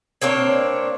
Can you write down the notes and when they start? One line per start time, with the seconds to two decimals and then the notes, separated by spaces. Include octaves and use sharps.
0.22 A#3 C4 D4 C#5